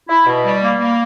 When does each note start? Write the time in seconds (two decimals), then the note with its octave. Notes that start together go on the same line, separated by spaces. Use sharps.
0.09 E4
0.27 B2
0.44 G3
0.62 A#3
0.79 A#3